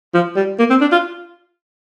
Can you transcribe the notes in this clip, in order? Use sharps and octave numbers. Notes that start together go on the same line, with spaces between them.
F3
G3
A#3
C4
D4
F4